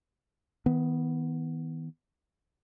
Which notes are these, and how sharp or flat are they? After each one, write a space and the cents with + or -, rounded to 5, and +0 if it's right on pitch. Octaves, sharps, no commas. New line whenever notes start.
D#3 +40 B3 +0